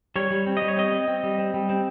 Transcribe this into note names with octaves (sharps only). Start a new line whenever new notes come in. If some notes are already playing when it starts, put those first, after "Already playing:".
G3 C#5
G3
C4
D#5
G3
C#5
C4 D#5
C4
C4
G3
C4
G3
C4